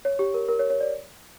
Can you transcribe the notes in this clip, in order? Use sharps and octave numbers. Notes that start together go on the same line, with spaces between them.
C#5
G4
A#4
A#4
C#5
C#5
D5